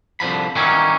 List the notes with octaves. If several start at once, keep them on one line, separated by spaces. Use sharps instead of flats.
C2 D3 F3 B5
D#3 E3 F#3 G3 A#3 C#4